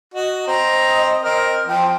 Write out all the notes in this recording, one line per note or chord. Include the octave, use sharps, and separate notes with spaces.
F#4 D#5
C4 A#5
C4 A#4
F3 C4 G5